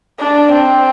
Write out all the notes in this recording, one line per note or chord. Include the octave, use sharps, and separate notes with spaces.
D4
C4